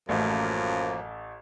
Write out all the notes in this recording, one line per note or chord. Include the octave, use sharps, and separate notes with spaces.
A1 F#2 F3 A3 A#3